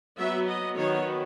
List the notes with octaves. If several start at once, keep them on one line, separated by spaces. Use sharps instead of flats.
F#3 B3 E5
D#5
D#3 F#3 B3 C#5